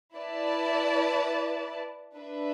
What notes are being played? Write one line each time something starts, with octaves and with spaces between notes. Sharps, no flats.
E4 B4 D5 A5
D4 B4 E5